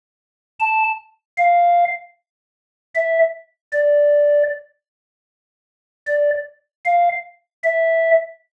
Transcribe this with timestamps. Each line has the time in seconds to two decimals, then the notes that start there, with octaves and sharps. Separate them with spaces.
0.60 A5
1.38 F5
2.95 E5
3.73 D5
6.07 D5
6.86 F5
7.64 E5